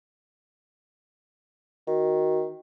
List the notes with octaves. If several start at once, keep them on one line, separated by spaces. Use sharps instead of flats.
D#3 F#4